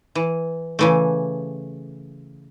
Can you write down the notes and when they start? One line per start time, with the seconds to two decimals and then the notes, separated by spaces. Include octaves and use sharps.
0.15 E3
0.79 C#3 E3 A3